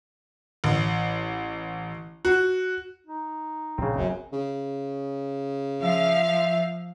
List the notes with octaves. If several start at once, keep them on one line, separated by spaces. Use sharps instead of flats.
A1
F#4
D#4
A#1 C#3 C4
F#1 F#2 A#2 C#4
C#3
F3 E5 F5